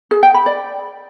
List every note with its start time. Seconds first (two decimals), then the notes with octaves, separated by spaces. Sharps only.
0.11 G#4
0.23 G5
0.34 B5
0.46 D5